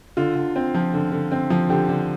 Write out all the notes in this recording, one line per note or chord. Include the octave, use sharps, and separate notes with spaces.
D3 F4
D3
C4
F3
D3
D3
C4
F3
D3 G4
D3